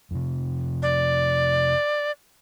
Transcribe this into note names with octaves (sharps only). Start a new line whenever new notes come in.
F2 C3
D5